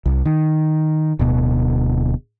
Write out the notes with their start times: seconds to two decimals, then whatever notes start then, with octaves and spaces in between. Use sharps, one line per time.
0.06 C2
0.25 D#3
1.19 D1 B2